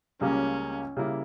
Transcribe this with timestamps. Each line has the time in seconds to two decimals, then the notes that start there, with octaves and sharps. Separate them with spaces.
0.21 C#2 C#3 G3 A#3 C#4
0.97 C#3 G3 A#3 E4